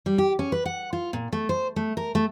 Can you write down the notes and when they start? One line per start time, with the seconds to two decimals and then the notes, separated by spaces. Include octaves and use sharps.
0.06 G3
0.18 G4
0.39 C#4
0.52 B4
0.65 F#5
0.93 F4
1.13 A#2
1.32 A3
1.49 C5
1.76 A3
1.97 A#4
2.15 A3